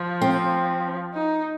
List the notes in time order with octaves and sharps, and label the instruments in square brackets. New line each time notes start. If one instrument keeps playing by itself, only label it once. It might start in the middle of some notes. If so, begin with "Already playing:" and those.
Already playing: [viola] F3
[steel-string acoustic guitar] C4
[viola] D#4